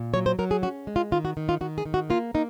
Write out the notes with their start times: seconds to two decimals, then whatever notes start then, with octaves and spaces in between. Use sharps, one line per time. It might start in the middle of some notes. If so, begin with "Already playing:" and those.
Already playing: A#2
0.14 F#3 C#5
0.26 C5
0.39 F#3 A#4
0.51 G#4
0.62 C#4 F#4
0.87 G#3
0.96 F4
1.12 D#3 F4
1.25 F#4
1.37 D#3
1.49 F4
1.61 D#3 F#4
1.78 G#4
1.86 D#3
1.94 F#4
2.10 A#3 F4
2.34 A#3 D#4